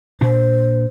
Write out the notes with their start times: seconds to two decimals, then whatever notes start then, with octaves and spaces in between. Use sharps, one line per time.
0.21 A#2 D4 C5